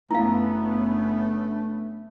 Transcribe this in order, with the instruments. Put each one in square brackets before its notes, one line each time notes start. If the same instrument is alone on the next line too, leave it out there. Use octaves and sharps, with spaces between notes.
[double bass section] F#1 B3 C#4 [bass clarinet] A3 [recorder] D4 [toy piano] E4 F5